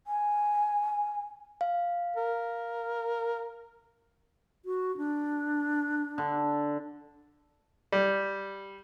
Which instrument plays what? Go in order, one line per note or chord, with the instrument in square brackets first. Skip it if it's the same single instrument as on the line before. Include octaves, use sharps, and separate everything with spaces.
[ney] G#5
[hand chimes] F5
[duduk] A#4
[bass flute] F#4
D4
[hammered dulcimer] D3
[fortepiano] G3